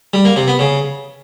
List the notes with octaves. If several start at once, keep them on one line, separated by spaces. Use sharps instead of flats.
G3
A#3
C3
B3
C#3